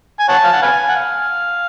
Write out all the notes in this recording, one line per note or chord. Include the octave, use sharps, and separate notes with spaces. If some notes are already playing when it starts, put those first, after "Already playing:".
G#5
C#5 F#5 A5
F5
F#5
B4 F5 G#5
F#5
F5